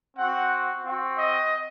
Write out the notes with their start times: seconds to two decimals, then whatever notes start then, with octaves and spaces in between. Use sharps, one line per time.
0.16 C4 F#4 F#5
0.83 C4 F#4
1.18 D#5